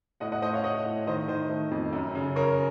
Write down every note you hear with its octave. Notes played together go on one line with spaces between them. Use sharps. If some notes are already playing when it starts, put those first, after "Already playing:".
A2 D#5 F#5
D#5 F#5
A3 C5 D#5
C#5 F5
A3 D#5 F#5
A2
D#3 C5 D#5
D#3 C5 D#5
A3
F2
F#2
C#3
C#3 A#4 C#5